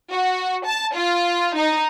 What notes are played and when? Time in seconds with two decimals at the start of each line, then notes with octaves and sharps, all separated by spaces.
0.10 F#4
0.65 A5
0.94 F4
1.56 D#4